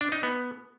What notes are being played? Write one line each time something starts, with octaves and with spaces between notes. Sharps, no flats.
D4
D#4
B3